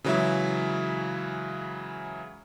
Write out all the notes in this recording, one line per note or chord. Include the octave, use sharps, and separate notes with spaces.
C#3 E3 F#3 G#3 E4 E5